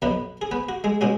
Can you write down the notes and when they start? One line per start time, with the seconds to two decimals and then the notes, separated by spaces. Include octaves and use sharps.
0.02 B1 B2 F#3 B3 B4
0.41 G#4
0.51 B3 B4
0.69 F#4
0.84 G#3 G#4
1.01 B2 G#3 C#4 F#4